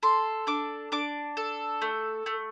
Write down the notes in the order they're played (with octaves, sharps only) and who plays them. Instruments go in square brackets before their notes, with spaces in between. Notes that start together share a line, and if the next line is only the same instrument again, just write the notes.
[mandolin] A4 C6
D4 D6
D4 D6
A4
A3
A3